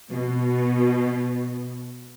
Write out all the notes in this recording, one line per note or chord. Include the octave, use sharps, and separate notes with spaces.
B2